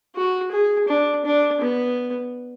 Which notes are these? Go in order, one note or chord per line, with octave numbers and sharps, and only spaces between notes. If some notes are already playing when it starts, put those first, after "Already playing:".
F#4
G#4
D4
D4
B3